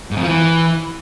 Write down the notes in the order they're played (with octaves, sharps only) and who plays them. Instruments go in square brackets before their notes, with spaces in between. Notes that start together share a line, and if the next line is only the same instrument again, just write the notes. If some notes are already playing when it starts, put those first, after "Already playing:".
[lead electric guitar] G#2
F2
F3
E3